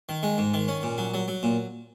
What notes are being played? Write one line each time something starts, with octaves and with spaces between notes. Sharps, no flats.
D#3
G#3
G#2
D#3
C#4
A#2
F#3
F#3
F#3
A#2